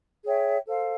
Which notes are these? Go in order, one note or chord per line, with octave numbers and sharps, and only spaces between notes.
G#4 C#5 E5 G5
A4 C5 F5